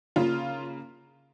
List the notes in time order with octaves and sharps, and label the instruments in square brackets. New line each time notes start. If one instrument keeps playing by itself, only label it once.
[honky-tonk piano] C#3 A#3 F4